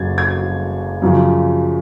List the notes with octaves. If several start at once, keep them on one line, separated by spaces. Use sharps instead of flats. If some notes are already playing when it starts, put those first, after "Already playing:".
Already playing: F#1 F#2 C#3 G#6 A6
G#6
F#2 C#3 F3